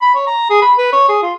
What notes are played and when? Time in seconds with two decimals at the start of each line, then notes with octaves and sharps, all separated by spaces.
0.02 B5
0.15 C#5
0.27 A#5
0.50 G#4
0.62 B5
0.78 B4
0.93 C#5
1.09 G#4
1.23 F4